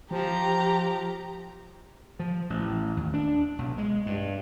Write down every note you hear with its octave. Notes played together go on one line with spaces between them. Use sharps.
F3 G4 A#5
F3
A1
D#2
D4
B1
G#3
G2